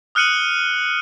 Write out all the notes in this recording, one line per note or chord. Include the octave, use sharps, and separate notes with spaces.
D#6 F6 F#6 C#7 D#7 F#7